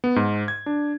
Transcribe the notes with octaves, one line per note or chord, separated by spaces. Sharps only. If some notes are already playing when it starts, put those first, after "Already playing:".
B3
G#2
G#6
D4